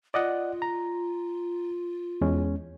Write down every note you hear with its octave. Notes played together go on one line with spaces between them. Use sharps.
F4 D5 D#5 F#5
A#5
E2 G#3 C#4